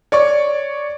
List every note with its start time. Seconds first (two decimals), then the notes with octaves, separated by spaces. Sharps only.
0.12 C#5 D5 C#6